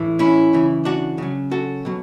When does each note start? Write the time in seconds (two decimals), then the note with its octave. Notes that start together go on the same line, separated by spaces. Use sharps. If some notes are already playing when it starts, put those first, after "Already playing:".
Already playing: A2 E3
0.19 C#4 E4
0.53 C#3 E3
0.85 D4 F#4
1.18 C#3 F#3
1.51 F#4 A4
1.85 B2 F#3